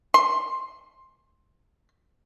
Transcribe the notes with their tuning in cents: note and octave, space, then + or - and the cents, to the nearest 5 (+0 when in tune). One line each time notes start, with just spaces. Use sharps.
C6 +15